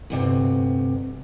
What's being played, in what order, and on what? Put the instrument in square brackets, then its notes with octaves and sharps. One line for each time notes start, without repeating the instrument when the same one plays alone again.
[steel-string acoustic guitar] D2 G2 C3